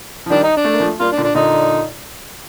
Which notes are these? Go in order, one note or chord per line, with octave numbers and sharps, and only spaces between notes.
F3
D#3 G3 D4
D#4
D4
A3
A#3
F3 A3
G3 A#3 F4
D4
A#2 D3
D4
A#2 D3 D#4